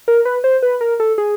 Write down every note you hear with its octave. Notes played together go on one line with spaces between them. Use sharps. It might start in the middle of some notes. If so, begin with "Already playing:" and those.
A#4
B4
C5
B4
A#4
A4
G#4